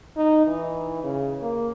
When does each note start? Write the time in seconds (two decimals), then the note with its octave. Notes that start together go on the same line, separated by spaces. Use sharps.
0.16 D#4
0.47 E3
1.03 C#3
1.42 A#3